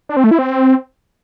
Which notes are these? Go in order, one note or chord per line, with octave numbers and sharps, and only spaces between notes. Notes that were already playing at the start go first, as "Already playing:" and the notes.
D4
C4
A3
E4
C4